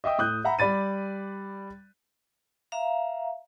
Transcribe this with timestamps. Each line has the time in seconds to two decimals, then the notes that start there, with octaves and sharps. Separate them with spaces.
0.04 D#5 E5 G5 D#6
0.18 A2 D#6 F#6 G6
0.45 E5 F#5 A#5 B5
0.59 G3 D5 B5 A6 D#7
2.72 E5 F5 A#5